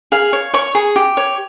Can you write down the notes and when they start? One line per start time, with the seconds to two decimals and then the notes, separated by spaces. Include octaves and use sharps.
0.12 G#4 F5
0.33 C#5
0.54 C#5 C#6
0.75 G#4
0.96 G4
1.17 C#5